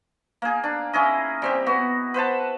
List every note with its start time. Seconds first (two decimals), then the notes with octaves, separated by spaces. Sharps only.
0.42 A#3 G#4
0.64 D4
0.93 C#4 E4 G#4 D#5
1.42 G3 C4 G4
1.66 B3 F#4
2.14 B4 C5 F#5 A5